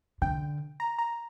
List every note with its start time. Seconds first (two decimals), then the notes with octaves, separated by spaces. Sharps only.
0.22 D3 G5
0.80 A#5
0.99 A#5